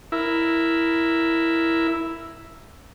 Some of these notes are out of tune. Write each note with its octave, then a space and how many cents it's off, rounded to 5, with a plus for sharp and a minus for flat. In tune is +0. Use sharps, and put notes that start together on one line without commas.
E4 +0 A#4 +0